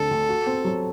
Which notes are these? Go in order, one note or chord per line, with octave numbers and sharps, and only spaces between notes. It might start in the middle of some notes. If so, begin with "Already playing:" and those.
Already playing: D2 D3 C4 A4
D2
F#4
C4
F#3